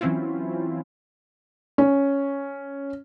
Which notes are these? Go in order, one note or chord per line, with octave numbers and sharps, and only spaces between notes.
E3 F#3 C4 C#4 E4 F4
C#4